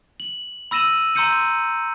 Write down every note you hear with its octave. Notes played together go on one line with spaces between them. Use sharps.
F#7
B5 E6 A#6 D#7 E7 F#7
A#5 C6 E6 G6 C#7 D#7